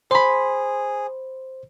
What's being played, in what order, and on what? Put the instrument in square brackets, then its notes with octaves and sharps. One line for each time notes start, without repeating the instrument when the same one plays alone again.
[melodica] G#4 [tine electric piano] C5 [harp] B5 C6